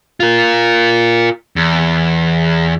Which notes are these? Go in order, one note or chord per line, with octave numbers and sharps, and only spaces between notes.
F4 A#4
E2